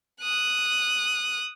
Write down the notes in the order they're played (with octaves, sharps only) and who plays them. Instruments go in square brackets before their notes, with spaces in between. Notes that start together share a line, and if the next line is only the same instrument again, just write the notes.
[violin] D#6 F#6